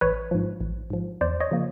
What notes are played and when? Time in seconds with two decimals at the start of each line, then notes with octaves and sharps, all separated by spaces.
0.01 A1 B4 C#5
0.31 G#2 F3
0.61 A1
0.90 G#2 F3
1.21 E2 C5 D5
1.40 C#5 D#5
1.51 C#3 F3 A#3